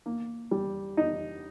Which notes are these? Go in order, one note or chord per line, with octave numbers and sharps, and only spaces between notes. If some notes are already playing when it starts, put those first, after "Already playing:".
A#3
G3
D#4